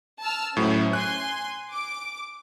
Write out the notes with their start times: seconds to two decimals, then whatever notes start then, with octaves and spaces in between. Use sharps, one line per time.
0.21 A5 E6 F6
0.57 A2 F#3 C#4 E4 C5
0.93 G#5 C6 F#6
1.72 D6